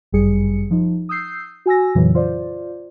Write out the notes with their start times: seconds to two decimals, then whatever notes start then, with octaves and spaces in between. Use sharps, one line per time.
0.12 G1 F#2 G3 G#4 C#7
0.71 F3 D#4
1.09 D#6 E6 G6 C7
1.66 F#4 G#5 E6 A#6
1.95 F2 A#2 C#3 E3 F#3
2.15 F4 C5 D5